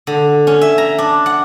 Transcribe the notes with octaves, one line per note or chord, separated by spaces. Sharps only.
D3
C#4
E5
A#5
D4
F#5